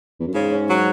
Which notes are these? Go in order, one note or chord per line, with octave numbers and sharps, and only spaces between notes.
E2
F#2
G#2 C#3
C#4
F#3